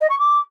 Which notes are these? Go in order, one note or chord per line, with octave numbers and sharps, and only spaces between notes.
D#5
C#6
D6